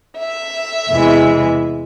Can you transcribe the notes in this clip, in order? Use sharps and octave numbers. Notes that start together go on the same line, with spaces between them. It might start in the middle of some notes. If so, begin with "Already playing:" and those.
E5
E2 C3 E3 G#3